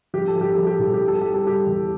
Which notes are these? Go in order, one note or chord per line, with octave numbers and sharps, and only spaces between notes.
F3 G4
A4
F3
G4
F3 A4
G4
C2 A4
G4
G3
A4
G3 G4
A4
G3 G4
E2